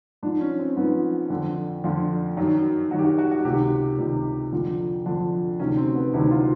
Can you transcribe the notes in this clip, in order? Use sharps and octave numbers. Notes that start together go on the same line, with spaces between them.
G#2 F3 D4
C#4
C4
G#2 F3 B3
F2 D3 F3
F2 D3 F3 F4
F#2 D#3 F#3
F#2 D#3 F#3 F#4
G4
F#4
F#4
F#4
C#2 C3 D#3 G4
C#2 C3 D#3
F2 D3 F3
F2 D3 F3 D4
D2 C3 D#3 F#3 C#4
C4
B3
D2 C3 D#3 F#3 E4
F4